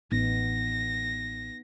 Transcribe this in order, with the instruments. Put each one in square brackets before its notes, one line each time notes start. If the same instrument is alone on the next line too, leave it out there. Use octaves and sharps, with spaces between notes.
[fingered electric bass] A1 [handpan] B3 D#4 [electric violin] A#6